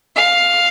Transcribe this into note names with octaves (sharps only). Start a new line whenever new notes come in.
F5